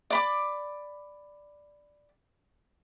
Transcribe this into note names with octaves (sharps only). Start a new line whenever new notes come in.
D5 B5 D6